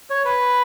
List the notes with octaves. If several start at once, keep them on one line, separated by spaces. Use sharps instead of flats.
C#5
B4